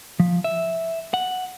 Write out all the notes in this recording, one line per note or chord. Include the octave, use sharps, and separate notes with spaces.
F3
E5
F#5